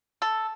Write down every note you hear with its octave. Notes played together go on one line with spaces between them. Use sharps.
A4